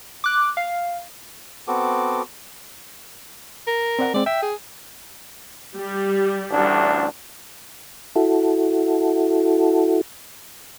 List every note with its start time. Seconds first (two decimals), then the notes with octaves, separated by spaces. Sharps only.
0.24 D6 F#6
0.57 F5
1.68 B3 C4 F#4 A4 D6
3.67 A#4
3.99 C4 D5 F#5
4.14 G#3 C4 D5
4.26 E5 G5
4.42 G#4
5.76 G3
6.51 A1 D2 D4
8.16 E4 F#4 A4